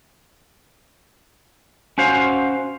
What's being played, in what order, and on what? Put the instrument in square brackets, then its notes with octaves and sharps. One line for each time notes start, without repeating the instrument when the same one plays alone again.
[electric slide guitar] C#4 F#4 C5 F5